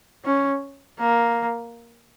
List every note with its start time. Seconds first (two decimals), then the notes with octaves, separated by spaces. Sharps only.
0.25 C#4
1.00 A#3